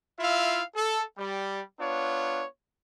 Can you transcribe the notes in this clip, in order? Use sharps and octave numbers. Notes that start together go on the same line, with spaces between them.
E4 F4 E5 F5
A4
G3
B3 D4 F4 C#5